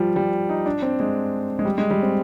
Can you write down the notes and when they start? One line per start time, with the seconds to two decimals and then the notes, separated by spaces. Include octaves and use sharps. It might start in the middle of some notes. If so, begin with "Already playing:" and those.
Already playing: F3 G3
0.16 G3
0.49 D#4
0.66 D4
0.82 C4
1.00 G#3
1.59 G#3
1.65 G3
1.78 G#3
1.91 G3
2.02 C4